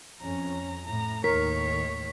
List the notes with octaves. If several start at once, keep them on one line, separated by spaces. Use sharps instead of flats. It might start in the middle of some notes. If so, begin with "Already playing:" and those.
F2 C#4 A#5
A2 A#5
D#2 A2 D#3 A#4 C#5 B6